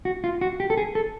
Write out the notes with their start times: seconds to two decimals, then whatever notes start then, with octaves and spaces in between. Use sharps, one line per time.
0.05 F#4
0.24 F4
0.41 F#4
0.60 G4
0.70 A4
0.77 G#4
0.95 A4